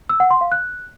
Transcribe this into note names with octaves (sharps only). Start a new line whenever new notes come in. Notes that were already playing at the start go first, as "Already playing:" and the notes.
E6
F#5
C6
F5
F#6